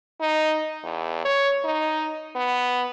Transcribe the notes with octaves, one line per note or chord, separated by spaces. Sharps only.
D#4
E2
C#5
D#4
B3